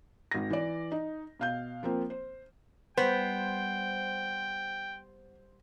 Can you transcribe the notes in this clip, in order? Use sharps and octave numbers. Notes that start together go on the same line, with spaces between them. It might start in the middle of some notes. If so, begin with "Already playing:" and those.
G#1 A#6
E3 D5
D#4
B2 F5 G6
F3 A#3 C4
C5
G3 B3 B4 C5 G5